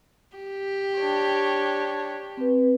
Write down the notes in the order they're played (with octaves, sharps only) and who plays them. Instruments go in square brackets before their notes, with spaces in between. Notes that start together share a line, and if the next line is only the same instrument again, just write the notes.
[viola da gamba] G4
[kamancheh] D4 C#5
[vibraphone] C4 B4